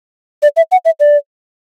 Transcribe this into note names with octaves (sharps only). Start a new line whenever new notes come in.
D5
E5
F#5
E5
D5